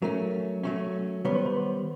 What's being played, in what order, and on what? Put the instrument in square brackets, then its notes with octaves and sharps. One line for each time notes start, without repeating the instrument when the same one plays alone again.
[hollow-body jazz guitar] F#3 A3 C#4 [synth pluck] A#4
[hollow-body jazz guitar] F#3 A3 C#4
[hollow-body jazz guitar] D#3 G3 B3 [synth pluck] C#5
[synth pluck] C5
B4
C5